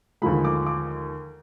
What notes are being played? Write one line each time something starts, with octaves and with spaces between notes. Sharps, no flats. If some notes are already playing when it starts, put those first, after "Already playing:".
D#2 D3 F3 G#3 B5
D6
D6